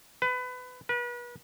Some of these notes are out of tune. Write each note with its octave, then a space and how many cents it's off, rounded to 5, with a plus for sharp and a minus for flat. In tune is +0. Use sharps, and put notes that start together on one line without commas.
B4 +25
B4 -35